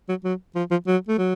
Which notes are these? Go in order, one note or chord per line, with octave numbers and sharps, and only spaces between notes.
F#3
F#3
F3
F3
F#3
A3
F#3